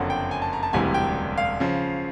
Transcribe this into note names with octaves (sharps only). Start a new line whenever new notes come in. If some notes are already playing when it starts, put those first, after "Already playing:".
Already playing: F#1 F2 D3 F#3 F#5
G5
G#5
A5
A#5
A5
E1 D2 C3 E3 G3 G#5
G5
F5
C#3 F3